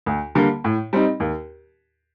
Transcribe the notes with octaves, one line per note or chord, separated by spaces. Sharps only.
D2
D3 G3 A#3
A2
G3 C4 D#4
D#2